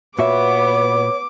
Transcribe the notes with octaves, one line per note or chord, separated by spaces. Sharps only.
A#2 B3 F#4 C#5 E5 D6